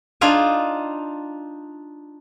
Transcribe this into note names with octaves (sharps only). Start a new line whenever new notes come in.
D4 D#4 F4 F5 G#5